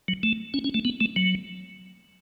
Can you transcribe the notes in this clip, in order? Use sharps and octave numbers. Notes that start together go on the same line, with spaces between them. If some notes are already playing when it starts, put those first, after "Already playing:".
F#3
A3
C#4
C#4
A3
B3
A3
F#3